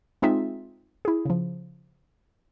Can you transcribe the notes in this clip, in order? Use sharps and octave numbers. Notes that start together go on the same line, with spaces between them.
G#3 C4 D#4 F4 G#4 E5
E4 G#4
C#3 F3